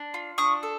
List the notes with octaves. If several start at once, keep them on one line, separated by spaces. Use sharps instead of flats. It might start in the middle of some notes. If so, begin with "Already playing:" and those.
Already playing: D4
F4
D4 C#6 D#6
A4